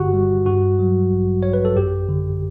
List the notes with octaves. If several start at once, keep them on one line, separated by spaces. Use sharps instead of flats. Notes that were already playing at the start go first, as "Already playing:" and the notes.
Already playing: G1 G2 D3 F#4 G4
G3
G2 F#4
F#3
A1
A1 C#5
B4
A4
F#2 G4
D3